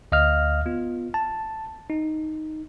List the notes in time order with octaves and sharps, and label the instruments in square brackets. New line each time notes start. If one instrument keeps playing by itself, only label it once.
[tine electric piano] D2 D#5 F5 F6
B3 F4
A5
D#4